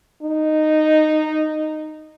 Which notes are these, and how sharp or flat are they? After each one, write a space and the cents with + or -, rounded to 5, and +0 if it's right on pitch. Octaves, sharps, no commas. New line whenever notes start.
D#4 -10